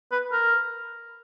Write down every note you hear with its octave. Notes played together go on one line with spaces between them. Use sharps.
B4
A#4